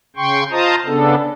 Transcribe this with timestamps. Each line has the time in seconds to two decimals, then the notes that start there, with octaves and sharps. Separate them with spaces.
0.16 C#3 G5 C6 C#6
0.51 F4 C5 D#5 A5 A#5 D#6
0.86 C#3 B3 D4 A4